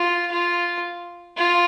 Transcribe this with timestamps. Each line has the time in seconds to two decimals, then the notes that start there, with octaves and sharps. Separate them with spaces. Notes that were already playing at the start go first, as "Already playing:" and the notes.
Already playing: F4
0.31 F4
1.37 F4